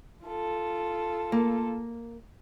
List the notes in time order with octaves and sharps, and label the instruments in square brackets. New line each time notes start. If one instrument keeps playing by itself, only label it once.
[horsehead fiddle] F4 A4
[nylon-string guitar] A#3